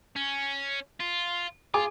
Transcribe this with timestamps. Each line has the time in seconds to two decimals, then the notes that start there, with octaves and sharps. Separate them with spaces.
0.16 C#4
1.00 F4
1.74 F4 G#4 G#5 D6